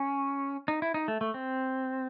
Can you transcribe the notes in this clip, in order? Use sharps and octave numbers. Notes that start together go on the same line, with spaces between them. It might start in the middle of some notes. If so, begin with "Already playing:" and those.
Already playing: C#4
D#4
E4
D#4
A3
A3
C4